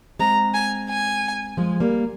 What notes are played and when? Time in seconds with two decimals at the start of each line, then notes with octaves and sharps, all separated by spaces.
0.19 G#3 C4 A#5
0.54 G#5
0.89 G#5
1.57 F3 G#3
1.80 G3 A#3